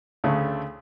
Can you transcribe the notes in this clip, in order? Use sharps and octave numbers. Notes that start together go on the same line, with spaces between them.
D2 C#3 A3